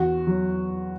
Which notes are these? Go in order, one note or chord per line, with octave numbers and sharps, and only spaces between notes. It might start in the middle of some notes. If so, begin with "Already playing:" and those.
Already playing: E2 F#4
F#3